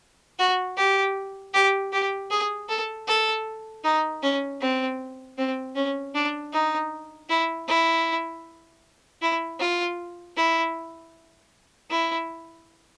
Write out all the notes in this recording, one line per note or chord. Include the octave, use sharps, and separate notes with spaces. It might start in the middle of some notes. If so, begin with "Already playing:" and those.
F#4
G4
G4
G4
G#4
A4
A4
D#4
C#4
C4
C4
C#4
D4
D#4
E4
E4
E4
F4
E4
E4